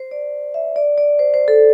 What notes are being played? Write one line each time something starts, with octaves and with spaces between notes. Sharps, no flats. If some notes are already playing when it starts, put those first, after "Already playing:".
Already playing: C5
D5
E5
D5
D5
C5
C5
A4